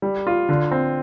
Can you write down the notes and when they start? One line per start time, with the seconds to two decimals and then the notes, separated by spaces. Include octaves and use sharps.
0.02 G3
0.27 F4
0.49 D3
0.71 C4